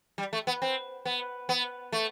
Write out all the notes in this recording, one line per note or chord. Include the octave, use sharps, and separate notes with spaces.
G3
A3
B3
C4
B3
B3
A3